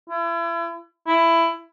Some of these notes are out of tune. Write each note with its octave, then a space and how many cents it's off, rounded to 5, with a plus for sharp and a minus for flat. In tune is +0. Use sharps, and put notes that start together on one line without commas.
E4 +40
E4 +15